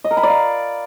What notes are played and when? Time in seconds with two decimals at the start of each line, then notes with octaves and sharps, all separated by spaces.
0.04 D#5
0.11 A#4
0.17 B5
0.23 D5
0.30 F5